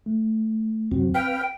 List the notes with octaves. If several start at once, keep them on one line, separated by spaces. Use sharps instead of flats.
A3
F#2 C3 F#3 C4
B4 F5 G5